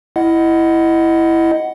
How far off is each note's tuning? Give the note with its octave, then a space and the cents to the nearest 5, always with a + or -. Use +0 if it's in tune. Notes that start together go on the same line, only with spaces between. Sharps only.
E4 +0 D#5 +0 F#5 +5